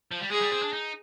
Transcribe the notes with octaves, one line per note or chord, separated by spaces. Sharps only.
F3
G3
G#3 G#4
G3
C4
D4
D#4